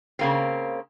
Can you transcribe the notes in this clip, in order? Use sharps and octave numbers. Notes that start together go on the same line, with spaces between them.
C#3 A#3 C4